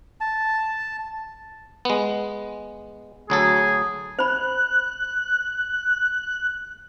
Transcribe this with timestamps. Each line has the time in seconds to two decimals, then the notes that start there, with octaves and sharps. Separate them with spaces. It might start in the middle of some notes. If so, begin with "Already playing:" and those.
0.21 A5
1.85 G#3 B3
3.30 D2 F#3 G#4 A4
4.19 C5 B5 F#6